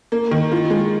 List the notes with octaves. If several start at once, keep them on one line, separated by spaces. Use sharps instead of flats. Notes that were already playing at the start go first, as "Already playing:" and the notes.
A#3
D#3
F4
G#3